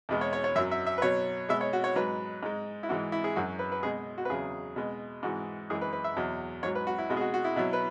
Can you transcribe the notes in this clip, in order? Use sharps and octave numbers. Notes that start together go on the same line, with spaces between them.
E2 B2 G#3
C#5
C#5
C#5
F#2 F#3 E5
E5
E5
B4
B2 F#3 C#5
B2 G#3 E5
C#5
F#4
C#5
G#2 F#3 B4
G#2 G#3
E4
G#2 E3 G#3 F#4
E4
G#4
F#2 F#3 F#4
B4
B4
B2 G#3 G#4
F#4
B4
E2 C#3 F#3 G#4
B2 G#3
G#2 E3 G#3 F#4
F#2 E3 G#3 G#4
B4
B4
E5
E2 B2 F#3
G#2 F#3 C#5
B4
F#4
E4
B2 G#3 F#4
G#4
F#4
F#4
E4
B2 F#3 E4
B4